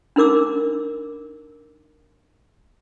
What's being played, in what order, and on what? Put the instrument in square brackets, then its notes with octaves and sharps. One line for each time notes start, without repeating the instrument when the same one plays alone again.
[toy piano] D4 D#4 A#4 D6 E6